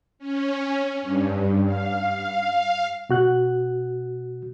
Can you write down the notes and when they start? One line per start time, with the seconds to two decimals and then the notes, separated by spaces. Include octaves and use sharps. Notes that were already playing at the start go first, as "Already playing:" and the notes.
0.19 C#4
1.02 G2
1.66 F5
3.09 B2 F#4 F#6